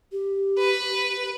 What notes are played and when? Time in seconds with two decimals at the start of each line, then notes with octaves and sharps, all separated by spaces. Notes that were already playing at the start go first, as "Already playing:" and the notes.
0.12 G4
0.58 B4